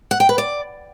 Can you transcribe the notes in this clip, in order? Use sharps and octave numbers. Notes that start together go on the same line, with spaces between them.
F#5
G5
B4
D5